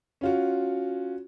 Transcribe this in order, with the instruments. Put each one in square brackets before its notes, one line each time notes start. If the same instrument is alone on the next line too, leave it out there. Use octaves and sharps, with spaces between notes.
[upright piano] C#4 F4 F#4